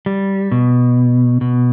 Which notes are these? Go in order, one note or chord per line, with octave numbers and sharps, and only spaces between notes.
G3
B2
B2